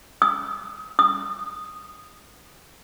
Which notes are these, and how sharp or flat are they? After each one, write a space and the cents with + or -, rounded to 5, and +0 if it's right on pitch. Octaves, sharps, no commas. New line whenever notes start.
D#6 +25
D#6 -5